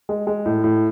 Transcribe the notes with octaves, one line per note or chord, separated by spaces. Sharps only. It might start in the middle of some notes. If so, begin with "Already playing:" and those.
G#3
G#3
A2
A2